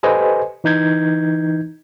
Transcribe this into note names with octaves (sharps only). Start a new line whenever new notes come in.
G4 A4 B4 C5 D#5 G#5
E3 D#4 G6 G#6